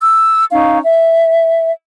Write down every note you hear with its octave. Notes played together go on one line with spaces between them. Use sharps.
E6
C#4 D#4 F5
E5